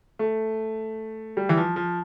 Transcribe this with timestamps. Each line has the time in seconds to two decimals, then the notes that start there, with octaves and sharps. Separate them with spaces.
0.19 A3
1.37 G3
1.49 E3
1.57 F3
1.76 F3